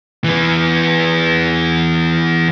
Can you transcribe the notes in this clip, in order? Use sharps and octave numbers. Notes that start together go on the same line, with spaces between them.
E3 B3